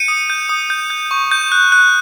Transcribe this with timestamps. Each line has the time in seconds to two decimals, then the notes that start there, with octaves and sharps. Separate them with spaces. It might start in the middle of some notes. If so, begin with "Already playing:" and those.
Already playing: G6 C#7 D#7
0.08 D#6
0.30 G6
0.49 D#6
0.70 G6
0.90 G6
1.11 C#6
1.31 G6
1.52 F#6
1.72 F#6